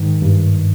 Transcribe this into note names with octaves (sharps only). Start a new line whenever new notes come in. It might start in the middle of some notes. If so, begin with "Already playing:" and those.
Already playing: G#2 D#3
G2